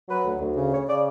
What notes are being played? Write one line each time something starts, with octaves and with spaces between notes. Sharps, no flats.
F#3 B4
D2
D2
C#3
C#3 C#5
C#3 D5